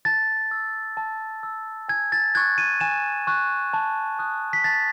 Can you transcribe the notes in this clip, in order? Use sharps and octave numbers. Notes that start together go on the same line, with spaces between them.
A5 A6
E6
A5
E6
G#5 G#6
A6
C#6 F#6 G#6
D#7
G#5 E7
C#6 F#6
A5
D#6 F#6
B6
A5 A6